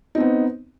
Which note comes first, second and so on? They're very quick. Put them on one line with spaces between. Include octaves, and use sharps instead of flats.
D#4 C4 B3